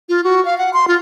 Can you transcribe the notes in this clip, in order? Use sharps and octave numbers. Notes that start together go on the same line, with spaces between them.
F4
F#4
F5
F#5
C6
F4